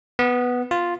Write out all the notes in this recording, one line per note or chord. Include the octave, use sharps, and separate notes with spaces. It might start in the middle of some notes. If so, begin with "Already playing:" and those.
B3
F4